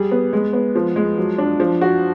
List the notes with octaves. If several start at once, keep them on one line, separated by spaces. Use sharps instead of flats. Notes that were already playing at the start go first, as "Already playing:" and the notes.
Already playing: G3 G#4
B3
G#3
B3
F3
G#3
F#3
D4
F3
F#4